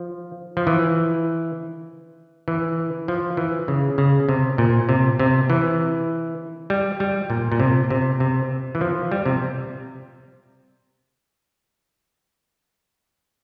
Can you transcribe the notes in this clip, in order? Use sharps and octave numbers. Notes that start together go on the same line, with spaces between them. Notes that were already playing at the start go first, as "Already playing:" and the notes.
Already playing: F3
F3
E3
E3
F3
E3
C#3
C#3
C3
A#2
C3
C3
E3
G3
G3
A#2
A#2
C3
C3
C3
E3
F3
G3
C3